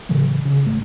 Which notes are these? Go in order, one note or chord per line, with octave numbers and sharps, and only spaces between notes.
A2 C#3 E3 F#3
C#3
G#1 A3